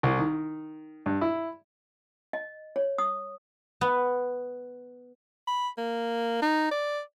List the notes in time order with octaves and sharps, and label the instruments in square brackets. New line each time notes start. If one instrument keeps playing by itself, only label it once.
[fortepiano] C2
D#3
G2
E4
[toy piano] D#5
C#5
D#6
[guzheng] B3
[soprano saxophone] B5
A#3
D#4
D5